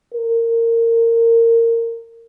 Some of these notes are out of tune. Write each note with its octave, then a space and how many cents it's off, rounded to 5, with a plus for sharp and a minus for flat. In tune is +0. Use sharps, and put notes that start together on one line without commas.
A#4 -20